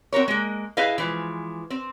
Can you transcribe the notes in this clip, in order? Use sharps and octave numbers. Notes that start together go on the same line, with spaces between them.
C4 F#4 A#4 C#5
G#3 A#3
E4 G#4 B4 D#5 F5
E3 F3 G#3
C4